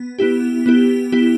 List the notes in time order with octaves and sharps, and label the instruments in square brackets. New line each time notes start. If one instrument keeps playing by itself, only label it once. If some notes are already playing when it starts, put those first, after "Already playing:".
Already playing: [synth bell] B3
B3 E4 G4
B3 E4 G4
B3 E4 G4